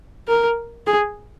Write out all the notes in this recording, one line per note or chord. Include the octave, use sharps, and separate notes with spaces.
A#4
G#4